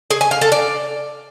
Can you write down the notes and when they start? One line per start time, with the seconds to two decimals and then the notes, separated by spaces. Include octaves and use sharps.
0.11 G#4
0.21 G#5
0.31 F5
0.41 A4
0.52 D5